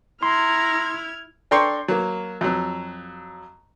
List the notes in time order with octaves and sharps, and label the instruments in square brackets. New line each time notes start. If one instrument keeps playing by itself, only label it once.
[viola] E4 [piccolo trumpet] A#5 [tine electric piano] C6 [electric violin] F6 G#6
[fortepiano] D4 A4 G5 A#5 C6 C#6
F#3 A#3
F2 F#3